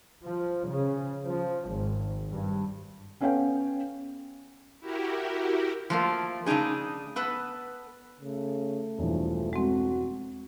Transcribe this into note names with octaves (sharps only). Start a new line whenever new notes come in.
F3
C#3
F3
G#1
G2
B3 C#4 A4 C#5 F5 G5
E4 F#4 G4 A#4
F3 A3 A#3
C#3 A3 D4 D#4 G#4
B3 A4 B4
C#3 A3
E1 G2 E3 F3
G#3 C4 F#4